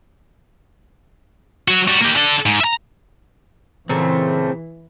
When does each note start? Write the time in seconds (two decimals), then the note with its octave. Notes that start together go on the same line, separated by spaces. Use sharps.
1.68 F#3 F#4
1.88 G3 F#4
2.00 A#3 G4
2.15 D3 A4
2.46 G#2
2.60 E5 A#5
3.89 A#2 C#3 E3 A3 C4